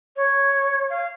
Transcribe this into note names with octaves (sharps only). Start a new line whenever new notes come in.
C#5
F5